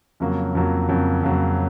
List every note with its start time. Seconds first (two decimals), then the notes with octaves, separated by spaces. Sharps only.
0.20 F2 C#3 F#3 A#3
0.55 F2 C#3 F#3 A#3
0.89 F2 C#3 F#3 A#3
1.23 F2 C#3 F#3 A#3